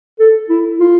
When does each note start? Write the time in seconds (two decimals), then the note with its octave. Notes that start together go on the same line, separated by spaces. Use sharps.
0.20 A4
0.49 E4
0.80 F4